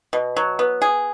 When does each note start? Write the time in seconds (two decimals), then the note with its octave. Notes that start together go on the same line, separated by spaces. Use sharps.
0.13 B2
0.37 F#3
0.59 B3
0.82 G#4